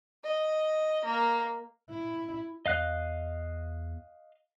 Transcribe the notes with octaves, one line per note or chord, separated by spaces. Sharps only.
D#5
A#3
E4
E2 D#5 F5 F#6